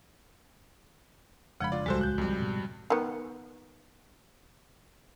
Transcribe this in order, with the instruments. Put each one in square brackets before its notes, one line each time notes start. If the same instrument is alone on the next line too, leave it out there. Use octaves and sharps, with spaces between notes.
[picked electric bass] F1 G#3 D4 [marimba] C#3 F3 [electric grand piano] F#5 B5
[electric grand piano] F4 D5
[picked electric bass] D1 C2 F3 [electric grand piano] G3 A4 C5 [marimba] G#3 F#4
[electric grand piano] F#6 G6
F2 G3
[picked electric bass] G#2 B2
[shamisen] D#3 B3